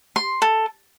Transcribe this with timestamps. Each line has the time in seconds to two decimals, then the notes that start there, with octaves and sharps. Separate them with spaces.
0.16 C6
0.42 A4